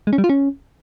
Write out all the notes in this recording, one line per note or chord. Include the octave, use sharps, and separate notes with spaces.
G#3
C#4
G3
F4
C#4